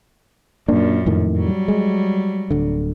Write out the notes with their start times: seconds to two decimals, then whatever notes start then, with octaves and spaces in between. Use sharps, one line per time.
0.68 F#2 A#2 A#3 D4
1.06 F2 A2 D#3
1.37 F#3 G3
1.68 G#3
2.51 D1 D3